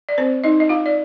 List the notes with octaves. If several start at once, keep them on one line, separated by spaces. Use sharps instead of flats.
D5
C4 C5
D#4 D#5
D#5
F4 F5
D5